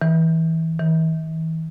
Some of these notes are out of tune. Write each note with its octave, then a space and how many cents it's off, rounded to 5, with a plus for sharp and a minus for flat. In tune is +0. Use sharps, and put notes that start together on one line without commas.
E3 -25
E3 -45